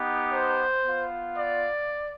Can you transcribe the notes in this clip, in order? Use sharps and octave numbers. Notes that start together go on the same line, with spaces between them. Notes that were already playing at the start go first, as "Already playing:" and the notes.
Already playing: B3 D#4 G4
C5
B3 F4
D5